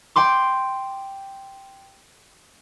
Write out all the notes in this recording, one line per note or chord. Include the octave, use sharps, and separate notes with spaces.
G5 C6 D6